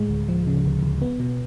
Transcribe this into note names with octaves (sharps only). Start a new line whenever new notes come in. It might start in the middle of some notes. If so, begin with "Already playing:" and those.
Already playing: A2 G#3
D2
F3
C#3
D2
D2
B3
B2